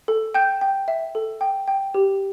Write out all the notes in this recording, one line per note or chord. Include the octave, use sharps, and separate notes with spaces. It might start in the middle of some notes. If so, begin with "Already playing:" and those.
A4
G5 G6
G5
E5
A4
G5
G5
G4